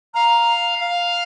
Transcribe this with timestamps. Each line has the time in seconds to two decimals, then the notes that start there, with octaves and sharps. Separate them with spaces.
0.14 F5 A#5
0.80 F5